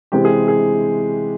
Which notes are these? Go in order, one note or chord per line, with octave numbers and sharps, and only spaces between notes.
C3 E3 G#3 C4 G4
G#4
G#4